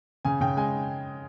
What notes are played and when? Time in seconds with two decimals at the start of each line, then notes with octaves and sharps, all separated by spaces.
0.25 C#3 G#5
0.41 C#3 G5
0.57 G#3 G#5